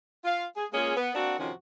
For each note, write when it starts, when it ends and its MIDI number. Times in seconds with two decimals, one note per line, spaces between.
0.25 0.44 65
0.25 0.44 77
0.56 0.66 68
0.72 0.94 56
0.72 0.94 58
0.72 0.94 61
0.72 0.94 65
0.72 0.94 68
0.96 1.11 59
1.15 1.37 58
1.15 1.37 60
1.15 1.37 62
1.15 1.37 66
1.38 1.51 41
1.38 1.51 48
1.38 1.51 51
1.38 1.51 53
1.38 1.51 61
1.38 1.51 66